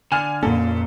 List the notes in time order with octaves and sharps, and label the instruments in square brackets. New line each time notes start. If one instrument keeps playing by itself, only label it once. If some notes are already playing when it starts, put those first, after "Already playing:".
[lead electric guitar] D3 [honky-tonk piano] G#5 F6 F7
[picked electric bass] F2 A#3 C#4 [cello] A#2 [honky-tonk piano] A4